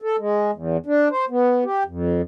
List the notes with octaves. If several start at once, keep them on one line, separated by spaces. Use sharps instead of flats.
A4
G#3
E2
D4
C5
B3
G4
F2